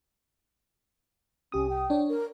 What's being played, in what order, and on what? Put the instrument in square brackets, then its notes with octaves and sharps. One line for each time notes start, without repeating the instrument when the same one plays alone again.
[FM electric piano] C2 G4 D#6 [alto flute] C#4
[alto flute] G5
[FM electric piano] D4 C#5
[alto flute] A#4